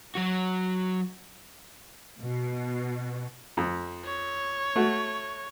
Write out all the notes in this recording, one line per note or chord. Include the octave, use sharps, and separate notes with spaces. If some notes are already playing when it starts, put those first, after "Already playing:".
F#3 F#4
B2
F2
C#5
A3 F#4